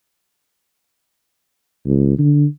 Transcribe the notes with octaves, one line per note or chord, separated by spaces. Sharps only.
C#2
D3